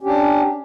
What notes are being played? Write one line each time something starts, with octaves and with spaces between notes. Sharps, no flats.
C#4 D4 G4